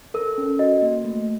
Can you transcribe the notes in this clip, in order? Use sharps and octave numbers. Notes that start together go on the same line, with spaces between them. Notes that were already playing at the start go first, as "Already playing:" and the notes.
A4 A#4
C#4
F#4 D#5
A#3
A3